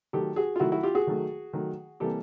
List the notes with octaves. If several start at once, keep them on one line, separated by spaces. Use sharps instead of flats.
D#3 F#3 A3 G4 A4
F#4 G#4
F4
D#3 F#3 A3 E4 F#4
E4 F#4
F4 G4
F#4 G#4
D#3 F#3 A3
D#3 F#3 A3
C3 E3 G3 A#3 G4 A4